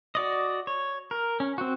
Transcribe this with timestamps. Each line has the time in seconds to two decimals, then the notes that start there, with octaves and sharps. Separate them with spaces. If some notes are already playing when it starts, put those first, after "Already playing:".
0.15 F#4 D5 D#5
0.67 C#5
1.11 A#4
1.40 C#4
1.58 C4 F#4